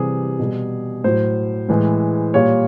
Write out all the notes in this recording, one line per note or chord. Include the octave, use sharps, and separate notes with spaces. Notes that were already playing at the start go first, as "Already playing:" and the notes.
Already playing: C3 E3 G3 G#4
B2 G3
A2 F#3 C5
A2 E3 G#3
A#2 G3 C#5